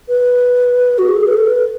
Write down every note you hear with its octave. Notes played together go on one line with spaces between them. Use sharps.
B4
F#4
G#4
A4
G#4
B4
A4
B4